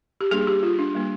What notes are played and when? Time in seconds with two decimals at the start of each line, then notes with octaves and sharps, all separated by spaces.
0.21 G4
0.31 G3 A#3 D4 G#4
0.47 G4
0.63 F4
0.79 D4
0.95 G3 A#3 D4